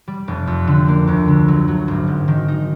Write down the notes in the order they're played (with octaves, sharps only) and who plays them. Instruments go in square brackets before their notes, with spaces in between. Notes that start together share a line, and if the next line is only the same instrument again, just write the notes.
[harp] G3
F1
F2
D3
A#3
D2
D3
F#3
F#3
G#1
G#2
D#3
D#4